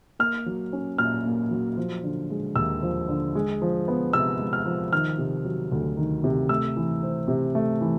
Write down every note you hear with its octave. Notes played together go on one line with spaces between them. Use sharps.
A#3 F6
F#3
C#4
A#2 F6
A#3
F#3
F3
D3
G#3
D#2 E6
F3
D3
G#3
F3
B3
C3 E6
G#3
F6
F3
D#3 F6
C3
F#3
D2
D#3
C3
A3 E6
E3
C4
C3
A3
E3